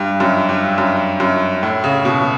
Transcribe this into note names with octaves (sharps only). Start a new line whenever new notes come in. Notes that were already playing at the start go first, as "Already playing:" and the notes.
Already playing: G2
F#2
G2
F#2
F#2
A2
C#3
B2